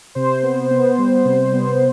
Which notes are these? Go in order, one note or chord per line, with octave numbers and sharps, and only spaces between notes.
C3 C5
B3
B3
G3
C3
B3